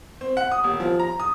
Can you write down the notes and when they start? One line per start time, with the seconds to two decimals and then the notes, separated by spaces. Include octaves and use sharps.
0.21 C4
0.37 F#5
0.52 D#6
0.64 D#1
0.80 F3
1.00 A#5
1.20 D#6